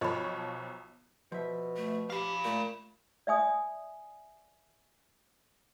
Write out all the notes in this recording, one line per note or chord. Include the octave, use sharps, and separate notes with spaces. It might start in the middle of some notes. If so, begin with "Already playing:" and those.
B1 F3 C#5 D#5 B5
B2 F3 E5
A3
G4 F5 B5
A#2 A3
D5 E5 G#5 D#6